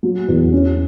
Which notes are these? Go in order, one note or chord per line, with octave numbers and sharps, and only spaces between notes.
F#3
E2
C#4